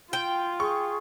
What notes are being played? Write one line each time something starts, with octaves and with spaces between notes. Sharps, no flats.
F4 G5
G#4 C#6